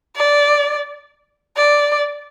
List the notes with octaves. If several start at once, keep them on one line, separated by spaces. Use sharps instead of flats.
D5
D5